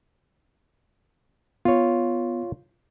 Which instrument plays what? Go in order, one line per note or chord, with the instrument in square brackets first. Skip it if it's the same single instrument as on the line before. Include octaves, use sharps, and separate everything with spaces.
[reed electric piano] B3 [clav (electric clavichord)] F4 C#5